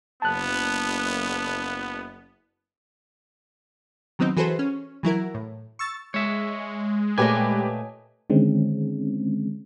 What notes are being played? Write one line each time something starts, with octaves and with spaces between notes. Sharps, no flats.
F#1 B3 A5 F#6
D#3 F#3 B3 C4 D#4
E3 F#4 G#4 A4 B4 C5
C#4
E3 F#3 E4 A#4
A2
C#6 E6 A6
G#3 C#5 E5
A#2 A3 G4 B4 C#5 D#5 G#5 D6
D3 D#3 G#3 C4 C#4